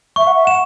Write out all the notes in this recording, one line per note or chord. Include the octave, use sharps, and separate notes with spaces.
E5 C#6
F#5
E5
F#5 E7